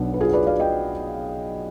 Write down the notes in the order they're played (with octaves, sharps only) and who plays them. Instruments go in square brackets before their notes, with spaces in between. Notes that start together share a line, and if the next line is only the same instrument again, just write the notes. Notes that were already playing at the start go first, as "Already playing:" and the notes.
Already playing: [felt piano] B1 B2 B3 D4
B4
F4 G#4
B4 D5
D5 F5
D#5 G5